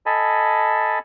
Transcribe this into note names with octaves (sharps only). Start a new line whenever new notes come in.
A4 D#5 G#5 A5 B5